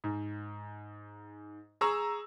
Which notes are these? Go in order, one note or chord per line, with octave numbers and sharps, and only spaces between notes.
G#2
G#4 A#5 C#6 E6